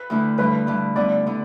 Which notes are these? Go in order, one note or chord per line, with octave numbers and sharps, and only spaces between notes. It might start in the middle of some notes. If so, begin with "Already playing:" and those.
Already playing: B4
D2 D3 A3 E4
G2 D3 A3 B4
G2 D3 A3
G2 D3 B3 E4 D5
D3 B3 E4